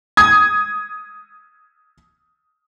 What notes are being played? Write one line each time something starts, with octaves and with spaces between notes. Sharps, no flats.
D#6 G#6